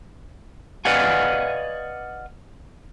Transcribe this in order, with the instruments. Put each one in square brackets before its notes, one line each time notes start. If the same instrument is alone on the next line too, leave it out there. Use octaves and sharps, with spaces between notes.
[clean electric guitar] B4 D5 D#5 F5 F#5 G#5